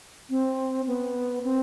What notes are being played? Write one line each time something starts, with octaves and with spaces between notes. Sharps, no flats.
C4
B3
C4